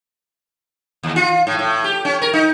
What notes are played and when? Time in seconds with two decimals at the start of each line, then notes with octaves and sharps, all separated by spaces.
1.03 D#2
1.16 F4
1.47 A2
1.59 A2
1.84 G4
2.05 C#4
2.22 A#4
2.33 D#4